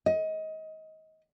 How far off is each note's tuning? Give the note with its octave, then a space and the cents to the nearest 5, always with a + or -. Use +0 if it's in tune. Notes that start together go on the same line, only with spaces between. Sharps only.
D#5 +25